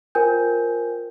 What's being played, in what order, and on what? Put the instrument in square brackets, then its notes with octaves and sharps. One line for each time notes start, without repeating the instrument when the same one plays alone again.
[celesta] F4 A#4 C5 G5 G#5 G6